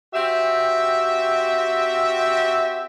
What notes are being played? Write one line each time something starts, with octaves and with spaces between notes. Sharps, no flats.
C4 F#4 G4 E5